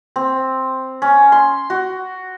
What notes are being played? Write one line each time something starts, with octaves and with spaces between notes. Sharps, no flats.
C4
C#4
C6
F#4